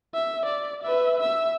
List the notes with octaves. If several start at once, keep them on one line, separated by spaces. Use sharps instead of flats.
E5
D5
B4 E5
E5 E6